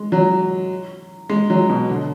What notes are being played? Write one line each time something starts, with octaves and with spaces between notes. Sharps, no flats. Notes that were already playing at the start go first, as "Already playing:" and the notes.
Already playing: G#3
F#3
G#3
F#3
B2
D3